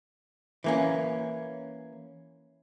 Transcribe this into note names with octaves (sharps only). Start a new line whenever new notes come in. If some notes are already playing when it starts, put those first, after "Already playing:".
E3 A#3 C#4